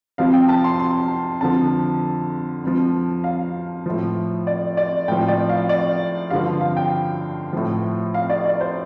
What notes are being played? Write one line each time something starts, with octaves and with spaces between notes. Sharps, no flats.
F2 C3 F3 F5
G5
A5
C6
C6
F2 D3 F3 A5
F2 F3
F5
A2 F3
D5
D5
A2 F3 G5
D5
F5
D5
G2 D3 F3 F5
F5
G5
A2 F3
F5
D5
D5
C5